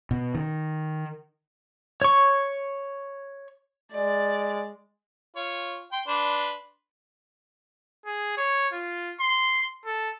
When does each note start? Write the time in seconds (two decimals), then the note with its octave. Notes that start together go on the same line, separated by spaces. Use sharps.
0.11 B2
0.35 D#3
2.02 C#5 C#6
3.92 G#3 D5
5.36 F4 C#5
5.92 G5 C6
6.08 D4 B4 C6
8.06 G#4
8.37 C#5
8.73 F4
9.20 C6
9.86 A4